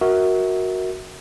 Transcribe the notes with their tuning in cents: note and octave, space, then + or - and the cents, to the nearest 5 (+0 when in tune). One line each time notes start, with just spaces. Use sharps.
F#4 +0 A#4 +0 E5 -30